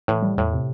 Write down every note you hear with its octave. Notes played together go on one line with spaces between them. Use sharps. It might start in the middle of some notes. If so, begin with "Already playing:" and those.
A2 E3
G3
E2 A2
C3